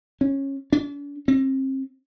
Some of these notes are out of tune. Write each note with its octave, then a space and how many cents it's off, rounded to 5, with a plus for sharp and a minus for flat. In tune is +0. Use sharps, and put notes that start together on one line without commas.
C#4 -15
D4 -45
C4 +35